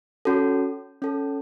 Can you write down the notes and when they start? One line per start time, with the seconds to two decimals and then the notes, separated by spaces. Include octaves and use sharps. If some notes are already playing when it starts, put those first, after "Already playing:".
0.25 C#4 F#4 A4
1.02 C#4 A4